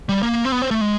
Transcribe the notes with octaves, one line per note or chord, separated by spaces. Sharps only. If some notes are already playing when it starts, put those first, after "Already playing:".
G3
A#3
C4
B3
C4
A3
G#3